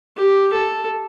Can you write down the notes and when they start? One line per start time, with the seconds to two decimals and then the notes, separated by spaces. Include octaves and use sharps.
0.16 G4
0.53 A4